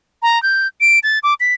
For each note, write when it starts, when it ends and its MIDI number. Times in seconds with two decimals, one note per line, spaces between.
0.23 0.41 82
0.43 0.67 91
0.81 0.99 98
1.03 1.19 93
1.23 1.34 86
1.40 1.54 95